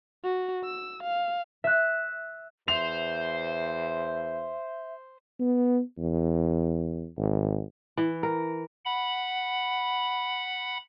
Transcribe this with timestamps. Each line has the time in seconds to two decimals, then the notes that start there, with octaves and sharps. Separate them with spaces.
0.23 F#4
0.64 E6
1.03 F5
1.64 E5 F#6
2.68 E2 C5 E5 F7
5.39 B3
5.98 E2
7.17 G#1
7.97 E3
8.23 A#4
8.85 F#5 B5